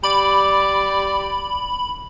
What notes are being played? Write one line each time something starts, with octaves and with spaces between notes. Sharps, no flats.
G3 D5 B5